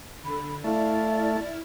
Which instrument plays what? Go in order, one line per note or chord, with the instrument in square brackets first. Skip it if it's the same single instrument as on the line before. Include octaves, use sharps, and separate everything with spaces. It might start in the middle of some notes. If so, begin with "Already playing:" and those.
[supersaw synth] D3 [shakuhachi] B5
[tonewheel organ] A3 [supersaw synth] E4 F6 [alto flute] D5 [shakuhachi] F5